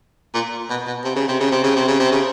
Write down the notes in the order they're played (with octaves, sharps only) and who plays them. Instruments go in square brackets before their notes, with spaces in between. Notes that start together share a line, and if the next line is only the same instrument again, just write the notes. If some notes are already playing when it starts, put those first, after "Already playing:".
[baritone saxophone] A#2
B2
B2
C3
C#3
C3
C#3
C3
C#3
C3
C#3
C3
C#3